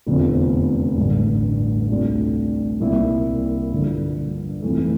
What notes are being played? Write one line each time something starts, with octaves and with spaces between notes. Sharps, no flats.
F1 E2 D3 F3 C4
A1 G2 D3
D2 C3 G3 D4 F4
C2 C3 G3 A#3 E4
G2 D3 F3
F1 F2 C3 E3 A3